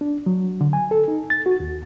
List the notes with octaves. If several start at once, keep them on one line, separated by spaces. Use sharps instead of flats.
D4
F#3
D3
G#5
A4
D#4
A6
F#4
D#2